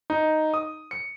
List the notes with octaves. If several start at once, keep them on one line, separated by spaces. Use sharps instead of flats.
D#4
D#6
C#7